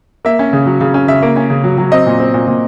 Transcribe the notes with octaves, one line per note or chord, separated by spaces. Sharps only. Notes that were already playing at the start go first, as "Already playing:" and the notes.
A#3 E5
C#4
C#3
F#3
C#3
C#4
C#3 E5
A#3
C#4
C#3
F#3
F#3
C4 D#5
A#2
C4
A#2
A#2